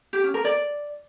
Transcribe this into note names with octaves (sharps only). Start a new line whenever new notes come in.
G4
C#4
A#4
D5